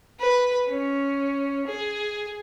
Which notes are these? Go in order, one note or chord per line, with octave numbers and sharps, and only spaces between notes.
B4
C#4
G#4